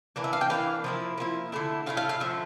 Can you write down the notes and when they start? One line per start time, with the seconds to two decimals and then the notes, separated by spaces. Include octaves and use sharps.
0.16 E3 A#3 D4
0.24 E5
0.33 F5
0.41 G5
0.50 E3 A#3 D4 F5
0.84 F3 A#3 E4
1.18 F3 A#3 E4
1.52 D3 A3 E4
1.86 D3 A3 E4 F5
1.97 F5
2.09 F5
2.20 D3 F3 A3 E5